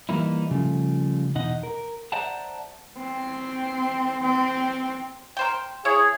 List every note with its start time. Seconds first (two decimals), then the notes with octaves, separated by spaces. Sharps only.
0.09 E3 G3 A#3 D#4 E4
0.51 C#3 F3 G3 A3
1.35 E2 B2 D#4 D#5 F#5
1.63 A#4
2.12 C5 D5 E5 F#5 A5 A#5
2.98 C4
4.23 C4
5.37 A#4 C5 G5
5.85 E4 G#4 C#5